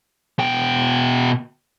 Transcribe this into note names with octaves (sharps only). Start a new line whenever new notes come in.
B2 G5